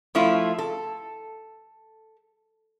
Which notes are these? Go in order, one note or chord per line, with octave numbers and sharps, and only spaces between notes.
F3 A3 E4 F4
A4